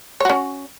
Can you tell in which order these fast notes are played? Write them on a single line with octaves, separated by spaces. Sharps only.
C#5 F#4 C#4